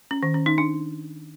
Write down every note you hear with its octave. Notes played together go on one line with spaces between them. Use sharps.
C#4
D#3
C#4
D#4
D4